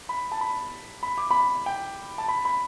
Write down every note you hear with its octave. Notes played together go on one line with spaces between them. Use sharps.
B5
A5
B5
B5
D6
B5
G5
A5
B5
B5